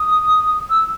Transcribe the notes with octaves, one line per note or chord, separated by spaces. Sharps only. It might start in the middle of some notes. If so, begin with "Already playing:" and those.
Already playing: D#6
E6